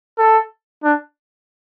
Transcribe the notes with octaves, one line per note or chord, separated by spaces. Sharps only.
A4
D4